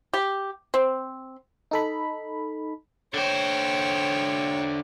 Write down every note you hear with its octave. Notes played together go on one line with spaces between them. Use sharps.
G4
C4
D#4 A4 B5
D3 C5 C#5 G5